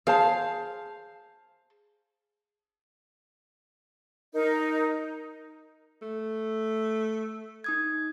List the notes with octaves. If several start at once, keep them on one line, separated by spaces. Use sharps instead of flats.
G#4 C5 F5 A5
D#4 A#4
A3
D#4 D#6 G#6